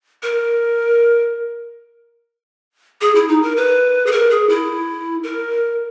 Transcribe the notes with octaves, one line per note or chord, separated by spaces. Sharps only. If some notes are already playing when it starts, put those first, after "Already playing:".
A#4
G#4
E4
D#4
A#4
B4
G#4
A#4
G#4
E4
A#4